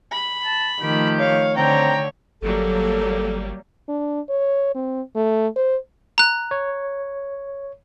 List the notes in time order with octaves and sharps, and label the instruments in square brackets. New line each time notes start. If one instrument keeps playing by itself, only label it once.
[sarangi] B5
[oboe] A5
[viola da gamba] D#3 F3 A3 [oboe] G4
[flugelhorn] C#5 [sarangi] F5
[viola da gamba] D3 C#5 [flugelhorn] C4 [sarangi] G5 [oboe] A#5
[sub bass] G1 [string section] F#3 G3 A#3 [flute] A4
[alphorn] D4
C#5
C4
A3
C5
[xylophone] A#5 F#6
[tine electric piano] C#5